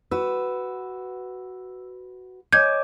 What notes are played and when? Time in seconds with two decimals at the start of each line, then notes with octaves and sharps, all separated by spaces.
0.11 F#4 B4 E6
2.53 C#5 D#5 G#5 D6 G6 G#6